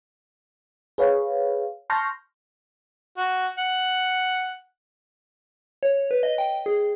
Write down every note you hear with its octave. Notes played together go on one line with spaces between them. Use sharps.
G#4 B4 C#5 F5
A5 C6 C#6 F6 G6 A#6
F#4
F#5
C#5
B4
D#5
G5
G#4